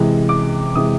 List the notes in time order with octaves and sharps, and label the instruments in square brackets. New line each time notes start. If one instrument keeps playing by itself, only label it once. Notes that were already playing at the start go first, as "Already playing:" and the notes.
Already playing: [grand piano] C3 E3 G#3
D6
C3 E3 G#3 D#6